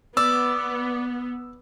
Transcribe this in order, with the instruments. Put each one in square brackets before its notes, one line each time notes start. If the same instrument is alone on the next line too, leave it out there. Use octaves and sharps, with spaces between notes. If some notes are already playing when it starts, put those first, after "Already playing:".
[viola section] B3 [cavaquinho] D5 [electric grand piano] E6